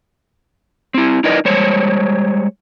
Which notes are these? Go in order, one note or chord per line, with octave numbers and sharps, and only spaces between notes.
C4 E4
D#4 E4 A#4 B4 D5 D#5
G3 G#3 C5 C#5